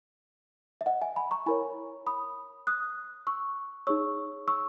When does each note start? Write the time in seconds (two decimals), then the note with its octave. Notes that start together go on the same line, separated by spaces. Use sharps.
0.81 E5
0.86 D#5 F#5
1.01 E5 G#5
1.16 G#5 B5
1.31 A#5 C#6
1.46 E4 A#4 C#5 G#5 B5
2.07 B5 D#6
2.67 D#6 F#6
3.27 C#6 E6
3.87 D#4 G#4 C#5 C#6 E6
4.48 C#6 E6